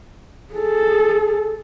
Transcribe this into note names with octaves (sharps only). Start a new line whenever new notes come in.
G#4 A4